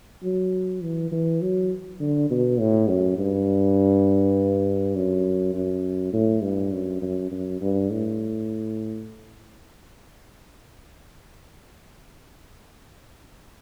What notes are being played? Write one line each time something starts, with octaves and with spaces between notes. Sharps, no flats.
F#3
E3
E3
F#3
D3
B2
A2
F#2
G2
F#2
F#2
A2
G2
F#2
F#2
F#2
G2
A2